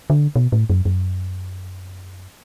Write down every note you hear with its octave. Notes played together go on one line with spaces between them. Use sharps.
D3
B2
A2
F#2
F#2